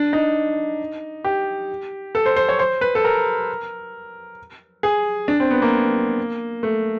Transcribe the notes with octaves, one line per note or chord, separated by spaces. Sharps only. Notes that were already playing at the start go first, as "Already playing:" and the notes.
Already playing: D4
D#4
G4
A4
C5
C5
C#5
C5
B4
A4
A#4
G#4
D4
C4
B3
A#3
A3